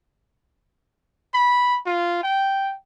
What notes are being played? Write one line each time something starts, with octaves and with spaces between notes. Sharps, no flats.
B5
F4
G5